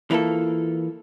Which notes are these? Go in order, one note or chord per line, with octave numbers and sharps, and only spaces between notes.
E3 A#3 F4 A4